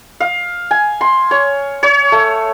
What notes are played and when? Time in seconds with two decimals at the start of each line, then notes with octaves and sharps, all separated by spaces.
0.20 F5
0.71 G#5
1.01 C6
1.31 C#5
1.83 C#5
2.12 A3